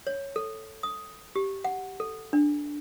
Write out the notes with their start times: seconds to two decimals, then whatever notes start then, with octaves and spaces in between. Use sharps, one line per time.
0.07 C#5
0.36 A4
0.83 D#6
1.36 G4
1.64 F#5
2.00 A4
2.33 D4